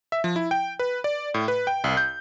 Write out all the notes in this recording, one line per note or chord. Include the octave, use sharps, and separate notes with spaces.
E5
F3
E4
G5
B4
D5
A2
B4
G5
C2
G6